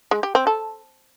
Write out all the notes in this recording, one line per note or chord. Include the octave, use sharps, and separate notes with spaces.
G#3
G4
C4
A4